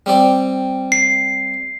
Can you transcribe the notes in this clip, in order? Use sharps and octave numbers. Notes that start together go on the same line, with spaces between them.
G3 C4 D5
C7